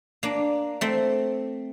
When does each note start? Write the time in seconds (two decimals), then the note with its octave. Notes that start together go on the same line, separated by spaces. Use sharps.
0.23 A#3 D4
0.81 A3 C4